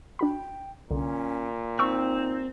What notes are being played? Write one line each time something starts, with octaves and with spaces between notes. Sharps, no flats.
D4 F#4 G5 B5
C2 A#2 D3 C#4
C4 D#4 G5 C#6 E6